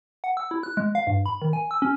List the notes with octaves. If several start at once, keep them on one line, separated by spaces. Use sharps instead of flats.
F#5
E6
E4
F#6
G#3
F5
G2
B5
D#3
G#5
E6
C#4